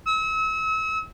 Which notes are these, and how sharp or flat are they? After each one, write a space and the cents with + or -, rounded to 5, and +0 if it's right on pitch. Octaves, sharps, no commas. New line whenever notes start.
E6 -40